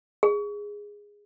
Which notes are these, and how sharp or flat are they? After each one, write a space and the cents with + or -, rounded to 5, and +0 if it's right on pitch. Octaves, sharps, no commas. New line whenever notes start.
G#4 -10